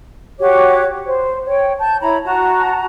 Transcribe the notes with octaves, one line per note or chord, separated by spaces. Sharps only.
F#4 G4 C#5 D6
C5
C#5 G5
A5 G6
E4 C#5 A#5 B5
F#4 A5 A#5